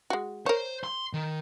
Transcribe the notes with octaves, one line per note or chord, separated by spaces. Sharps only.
G#3 F#4
A#4 C5 C#5
C6
D#3